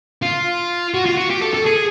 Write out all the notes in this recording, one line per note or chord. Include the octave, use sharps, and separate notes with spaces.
F4
F#4
F4
F#4
G4
A4
A4
G#4